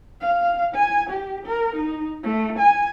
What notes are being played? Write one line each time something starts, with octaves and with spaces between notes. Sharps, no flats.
F5
G#5
G4
A#4
D#4
A3
G#5